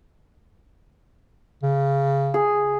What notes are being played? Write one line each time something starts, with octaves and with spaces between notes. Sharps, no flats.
C#3
G#4